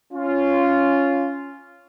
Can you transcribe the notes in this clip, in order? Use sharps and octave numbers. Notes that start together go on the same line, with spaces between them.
C#4 F4